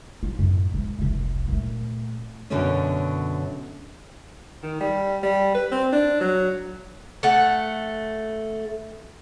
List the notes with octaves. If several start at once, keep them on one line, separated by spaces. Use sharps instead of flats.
F#3 F4
F#2 A2
E1
F1 C2
A#2 A3
F#2 B2 D3 F#3 A#3 C#4
D#3
G3
G3
B4
C4
D4
F#3
A3 F#5